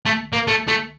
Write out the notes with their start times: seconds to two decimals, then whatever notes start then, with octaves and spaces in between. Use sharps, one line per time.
0.06 A3
0.33 A#3
0.47 A3
0.68 A3